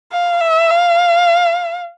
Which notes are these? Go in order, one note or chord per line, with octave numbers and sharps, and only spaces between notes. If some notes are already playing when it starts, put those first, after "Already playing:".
F5
E5
F5